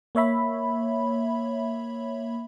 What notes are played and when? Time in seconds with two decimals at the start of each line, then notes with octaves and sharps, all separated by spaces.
0.15 A#3 C#5 E5 B5